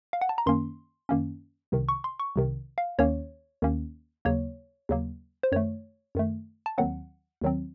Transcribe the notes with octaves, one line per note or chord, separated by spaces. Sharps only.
F5
F#5
A5
A#5
F#2 D#3 A#3 C#4 C6
F#2 D#3 A#3 C#4
C2 C3 D#3
C#6
C6
C#6
C2 C3 D#3
F5
D#2 D#3 A#3 C#4 C#5
D#2 D#3 A#3 C#4
D#2 C#3 F#3 A#3 C#5
D#2 C#3 F#3 A#3
C5
F#2 D#3 A3 C#5
F#2 D#3 A3
A5
D#2 D#3 F#3 C4 F#5
D#2 D#3 F#3 C4